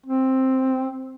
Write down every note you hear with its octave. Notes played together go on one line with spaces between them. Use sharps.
C4